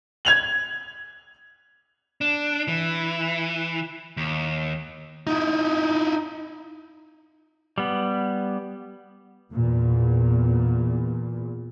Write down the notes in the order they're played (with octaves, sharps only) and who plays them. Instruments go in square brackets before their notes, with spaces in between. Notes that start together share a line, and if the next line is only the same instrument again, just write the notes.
[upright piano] G#6 F7 F#7
[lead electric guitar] D4
E3
D#2
D#4 E4
[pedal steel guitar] G3 B3
[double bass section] E2 A#2